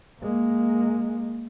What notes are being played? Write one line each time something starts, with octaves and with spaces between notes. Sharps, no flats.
G#3 A#3